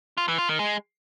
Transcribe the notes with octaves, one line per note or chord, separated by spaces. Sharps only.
F4
E3
F4
D#3
G#3